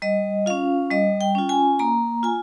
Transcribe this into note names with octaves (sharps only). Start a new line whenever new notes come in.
G3 D#5
C#4 F4 F5
G3 D#5
G5
C#4 F4
G#5
A#3 A#5
F4 G#5